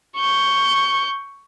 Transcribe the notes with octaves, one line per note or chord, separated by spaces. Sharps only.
C#6 G6